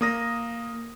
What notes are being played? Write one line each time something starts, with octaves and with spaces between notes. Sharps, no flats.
A#3 D#6 A#6